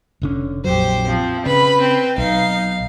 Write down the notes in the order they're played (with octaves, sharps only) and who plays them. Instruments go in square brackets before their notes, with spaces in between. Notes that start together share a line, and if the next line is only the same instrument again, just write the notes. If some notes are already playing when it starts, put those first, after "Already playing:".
[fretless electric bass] F1 D3 C#4
[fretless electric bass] A#1 F2 F#3 [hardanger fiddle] G4 C5
[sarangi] F3 [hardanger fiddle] C4
[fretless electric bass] C#3 [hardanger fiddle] B4 [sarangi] B5
[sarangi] C4
[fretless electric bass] B1 [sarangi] D#4 [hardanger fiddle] F5